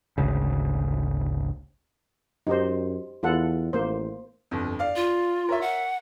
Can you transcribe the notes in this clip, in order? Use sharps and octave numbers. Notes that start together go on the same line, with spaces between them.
G#1 D2 C#3
F#2 D#4 G4 C5
E2 F4 A4 F#5
A1 A#3 C5
G1 F2
D5 F5
F4
A#4 C#5 E5
F#5